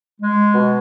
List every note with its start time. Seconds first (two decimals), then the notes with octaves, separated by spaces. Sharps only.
0.20 G#3
0.55 B2